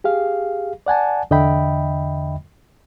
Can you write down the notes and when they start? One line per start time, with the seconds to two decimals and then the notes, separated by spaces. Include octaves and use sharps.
0.04 G4 G#4 F5
0.86 D5 F#5 G#5 A5
1.31 E2 D3 D#5 E5 G5 B5